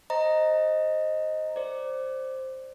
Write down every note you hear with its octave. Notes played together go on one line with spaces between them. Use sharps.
C5 D#5 A#5
C5 D5